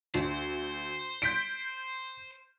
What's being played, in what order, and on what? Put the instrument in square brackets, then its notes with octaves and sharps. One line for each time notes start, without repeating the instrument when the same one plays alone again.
[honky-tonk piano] D2 [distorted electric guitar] C5
[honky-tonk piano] G6 B6 D7